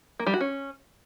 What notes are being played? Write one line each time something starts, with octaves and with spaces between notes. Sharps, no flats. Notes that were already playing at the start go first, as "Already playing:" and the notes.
A#3
G3
F#4
C#4